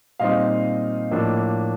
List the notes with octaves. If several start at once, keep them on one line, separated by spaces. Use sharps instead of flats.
A#2 G3 C4 D#4 D#5 F5
A2 F3 A#3 D4